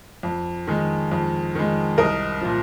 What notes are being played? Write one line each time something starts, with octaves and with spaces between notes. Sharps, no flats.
F2
D#3 G#3
F2
D#3 G#3
C2 A#4 D#5
A#2 F3